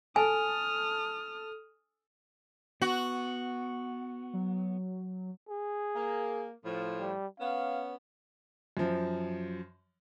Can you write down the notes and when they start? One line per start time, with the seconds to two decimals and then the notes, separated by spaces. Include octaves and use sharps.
0.16 A4 G#5 D#6 F6
2.82 B3 F#4
4.33 F#3
5.49 G#4
5.96 A#3
6.64 A2 F3
7.00 G3
7.40 B3 C#4 F5
8.77 F#2 F3